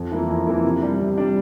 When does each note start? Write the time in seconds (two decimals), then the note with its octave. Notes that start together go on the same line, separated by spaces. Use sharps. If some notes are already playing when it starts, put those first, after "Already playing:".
Already playing: F2
0.11 E3 A#3 E4
0.28 F2
0.47 E3 A#3 E4
0.64 C3
0.82 G3 D4
1.00 C3
1.18 G3 D4